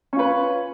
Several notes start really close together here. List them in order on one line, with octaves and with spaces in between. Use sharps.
C#4 F4 B4